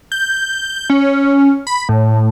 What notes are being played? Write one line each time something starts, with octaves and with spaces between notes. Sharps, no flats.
G6
C#4
B5
A2